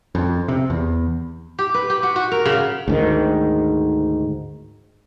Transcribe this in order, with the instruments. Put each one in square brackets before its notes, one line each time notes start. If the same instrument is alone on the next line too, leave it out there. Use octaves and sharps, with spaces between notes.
[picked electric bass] F2
C3
E2
[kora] G4
B4
G4
F#4
F#4
A#4
C#3
[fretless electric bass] D2 G#2 D#3